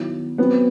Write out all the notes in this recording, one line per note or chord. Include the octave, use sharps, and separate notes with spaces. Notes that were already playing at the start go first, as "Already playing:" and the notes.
Already playing: D#3 F#3 B3 E4
F#3 B3 C4 F#4